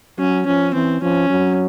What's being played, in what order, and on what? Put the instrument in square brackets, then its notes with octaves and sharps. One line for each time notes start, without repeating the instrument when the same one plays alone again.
[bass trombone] F#3 [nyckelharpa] C#4
[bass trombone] F3 [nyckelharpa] C#4
[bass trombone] E3 [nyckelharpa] C4
[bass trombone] F3 [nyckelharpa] C#4
[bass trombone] F#3